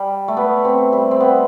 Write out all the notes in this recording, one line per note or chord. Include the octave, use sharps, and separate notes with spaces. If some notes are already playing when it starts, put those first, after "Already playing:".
Already playing: G3
A3
B3
C4
G3
C4
B3